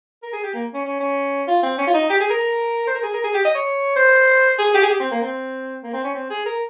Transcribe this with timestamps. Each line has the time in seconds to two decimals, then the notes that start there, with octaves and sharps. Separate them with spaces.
0.23 A#4
0.33 G#4
0.43 G4
0.54 A#3
0.74 C#4
0.86 C#4
1.00 C#4
1.48 F4
1.63 C4
1.78 C#4
1.87 F4
1.94 D#4
2.10 G4
2.20 G#4
2.30 A#4
2.87 C5
2.95 A#4
3.03 G#4
3.14 A#4
3.24 G#4
3.34 G4
3.45 D#5
3.55 C#5
3.96 C5
4.59 G#4
4.75 G4
4.83 G#4
4.90 G4
5.00 C4
5.11 A#3
5.21 C4
5.83 A#3
5.94 C4
6.04 C#4
6.15 C4
6.30 G#4
6.46 A#4